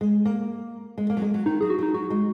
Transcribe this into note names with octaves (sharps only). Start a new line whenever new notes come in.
G#3
A#3
G#3
A#3
F#3
G#3
F#3
D#3 D#4
F#3 G#4
F#4
F#3 D#4
F#3 F#4
G#3